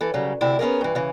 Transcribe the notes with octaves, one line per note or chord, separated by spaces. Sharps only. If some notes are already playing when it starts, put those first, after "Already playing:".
E3 A4
C#3 F#3 G3
D2 C3 E4 D5
B3 C#4 F4 G#4 A#4
G2 E3
C#3 E3